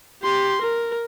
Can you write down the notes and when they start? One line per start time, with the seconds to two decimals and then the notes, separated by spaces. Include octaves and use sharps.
0.23 G4 C6
0.62 A#4